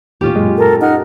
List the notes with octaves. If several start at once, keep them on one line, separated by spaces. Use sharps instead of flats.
D#2 A2 C#4 F4 G4
F#2 A#2 G#3
A4 A#4
D#4 F#5 F6